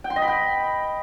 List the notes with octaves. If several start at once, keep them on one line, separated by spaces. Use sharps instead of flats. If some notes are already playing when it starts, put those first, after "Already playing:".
G5
C6
D#5
B5
G5